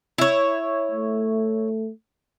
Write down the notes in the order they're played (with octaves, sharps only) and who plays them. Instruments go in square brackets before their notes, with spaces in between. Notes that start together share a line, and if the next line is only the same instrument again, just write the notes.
[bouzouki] E4 C#5
[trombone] A3